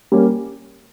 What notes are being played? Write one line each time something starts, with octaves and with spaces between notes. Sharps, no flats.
G3 A#3 C#4